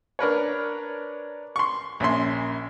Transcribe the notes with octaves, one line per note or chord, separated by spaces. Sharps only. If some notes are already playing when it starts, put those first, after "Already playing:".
D4 A#4 B4 C#5
C6 C#6
A#1 C#4 E5 C6